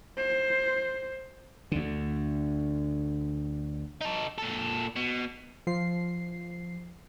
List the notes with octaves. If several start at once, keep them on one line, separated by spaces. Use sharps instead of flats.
C5
D2 D3
D#4 A4
A#2 A4
B2
F3 C7